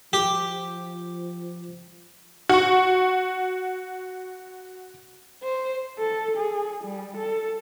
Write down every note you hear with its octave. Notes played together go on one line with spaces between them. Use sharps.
F3 G4
F#4 C#6
C5
A4
G#4
G3
A4